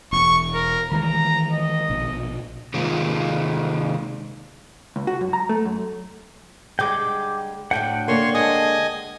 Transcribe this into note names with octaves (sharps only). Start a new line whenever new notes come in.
E1 C#6
A#4
D#3 E3 G#3 A#5
D#5
A#1 B2
C3 D#3 G#3 A#3 F4
C#2
F#4
F#2
A#5
A3
F#2
D3 G3 G#3 G5 D6
D2 A2 D4 F#5 G5
D3 A#3 C#5 C6 C#6
G#3 D4 D#5 G#5 D#6